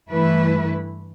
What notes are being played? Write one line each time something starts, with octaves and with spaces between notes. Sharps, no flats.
G2 E3 A3 E4 B4